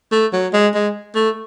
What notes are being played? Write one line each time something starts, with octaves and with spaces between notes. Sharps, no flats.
A3
F#3
G#3
G#3
A3